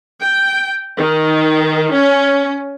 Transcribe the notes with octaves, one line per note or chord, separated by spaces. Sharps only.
G5
D#3
C#4